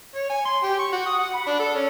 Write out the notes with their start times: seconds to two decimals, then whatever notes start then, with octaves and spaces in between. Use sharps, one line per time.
0.15 C#5
0.30 G#5
0.46 C6
0.63 G4
0.79 C#6
0.92 F#4
1.06 D#6
1.19 F#5
1.34 B5
1.47 D4
1.59 A4
1.75 C#4